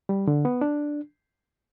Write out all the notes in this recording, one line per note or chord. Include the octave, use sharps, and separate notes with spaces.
G3
D3
B3
D4